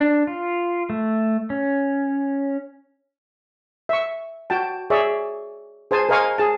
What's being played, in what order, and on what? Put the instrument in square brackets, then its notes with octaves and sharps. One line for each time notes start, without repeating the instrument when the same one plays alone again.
[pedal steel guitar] D4
F4
A3
C#4
[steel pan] E5 C#6
F#4 G5 A5
G#4 C#5 D5 E5
G#4 C5 G#5 A5
A#4 C5 D#5 F5 G#5 C#6
G#4 A5